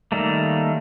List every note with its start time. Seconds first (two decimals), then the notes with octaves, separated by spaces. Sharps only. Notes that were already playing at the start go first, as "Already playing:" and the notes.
0.12 D#3 G3 A3 A#3